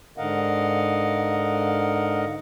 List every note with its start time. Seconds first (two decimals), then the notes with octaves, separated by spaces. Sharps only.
0.18 G#2 D3 A#4 D#5 F5 F#5